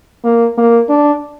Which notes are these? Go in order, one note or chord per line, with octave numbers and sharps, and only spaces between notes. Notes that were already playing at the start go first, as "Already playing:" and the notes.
A#3
A#3
D4